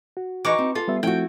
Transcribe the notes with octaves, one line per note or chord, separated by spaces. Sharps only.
F#4
E3 D#4 C#6 D6
C4
F4 A4
G3 B3 E5
F3 A3 C4 E4 F#4 G5